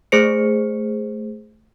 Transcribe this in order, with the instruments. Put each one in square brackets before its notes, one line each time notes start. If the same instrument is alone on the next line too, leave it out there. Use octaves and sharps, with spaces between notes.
[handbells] A3 G#4 C5 C#7